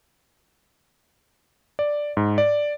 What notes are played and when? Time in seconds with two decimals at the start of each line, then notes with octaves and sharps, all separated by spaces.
1.79 D5
2.17 G#2
2.38 D5